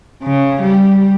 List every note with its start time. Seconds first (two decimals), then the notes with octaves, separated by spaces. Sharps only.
0.23 C#3
0.62 G3